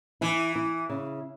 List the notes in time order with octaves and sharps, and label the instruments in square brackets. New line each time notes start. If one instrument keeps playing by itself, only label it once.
[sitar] E3 [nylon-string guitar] E4
[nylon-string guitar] E4
C#3